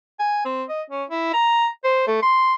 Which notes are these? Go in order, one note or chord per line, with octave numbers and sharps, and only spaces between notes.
G#5
C4
D#5
C#4
E4
A#5
C5
A3
C6